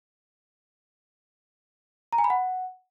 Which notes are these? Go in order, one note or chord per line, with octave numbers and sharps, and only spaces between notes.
A#5
G#5
B5
F#5